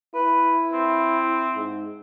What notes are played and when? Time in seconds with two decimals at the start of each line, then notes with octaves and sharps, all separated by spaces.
0.14 E4 B4
0.73 C4
1.56 G#2